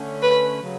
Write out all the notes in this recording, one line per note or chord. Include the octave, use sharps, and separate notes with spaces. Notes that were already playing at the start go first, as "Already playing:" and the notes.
Already playing: D3 A3 C#4
B4
C#3 F#3